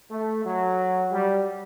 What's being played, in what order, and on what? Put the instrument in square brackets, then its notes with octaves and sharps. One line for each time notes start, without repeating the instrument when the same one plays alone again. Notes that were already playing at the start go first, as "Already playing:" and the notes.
[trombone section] A3
F#3
G3